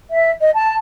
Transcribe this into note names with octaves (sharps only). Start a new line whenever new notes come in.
E5
D#5
A5